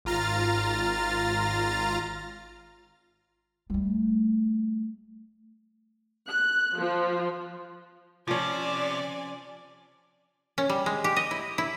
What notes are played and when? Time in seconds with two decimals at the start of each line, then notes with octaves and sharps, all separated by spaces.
0.05 G#1 F4 A#5 F6 A6
3.70 G3 A3
6.28 F#6
6.77 F3
8.28 C3 F3 C#4 D5 G#5
10.58 C#4
10.70 G3
10.86 G#3
11.04 G4
11.16 D#5
11.31 E4
11.58 E4